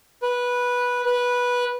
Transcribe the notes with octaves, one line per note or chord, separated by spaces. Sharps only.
B4
B4